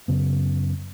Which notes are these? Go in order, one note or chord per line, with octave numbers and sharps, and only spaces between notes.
F#2 C#3 B3